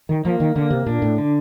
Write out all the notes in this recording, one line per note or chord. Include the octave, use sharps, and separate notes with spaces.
D#3
F3 A#3
D#3
D3 A#3
C3
A#2 D4
A2
D3